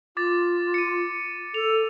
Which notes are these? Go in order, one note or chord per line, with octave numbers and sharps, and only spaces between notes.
F4 D6 A6
C#7 D#7
A4 F7